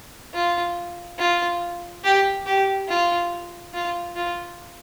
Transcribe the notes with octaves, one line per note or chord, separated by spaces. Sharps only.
F4
F4
G4
G4
F4
F4
F4